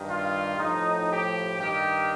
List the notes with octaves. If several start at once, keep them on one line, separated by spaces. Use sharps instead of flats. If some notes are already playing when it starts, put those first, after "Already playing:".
Already playing: G2 D#3
F4
A2 F3 D#4
G4
G2 D#3 G4